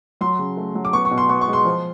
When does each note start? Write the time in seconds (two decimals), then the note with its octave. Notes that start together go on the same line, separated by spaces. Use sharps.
0.21 F#3 C6
0.39 C#3
0.57 A3
0.75 F#3
0.85 D6
0.93 B3 C#6
1.05 C#6
1.11 B2
1.18 C6
1.29 B3 C#6
1.41 C#6
1.48 G#3
1.53 C6
1.65 F3